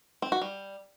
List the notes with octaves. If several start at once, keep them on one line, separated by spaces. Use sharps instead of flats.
C4
F#4
G3